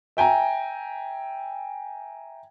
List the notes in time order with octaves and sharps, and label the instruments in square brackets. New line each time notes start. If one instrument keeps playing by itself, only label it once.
[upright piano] E5 G5 G#5 A#5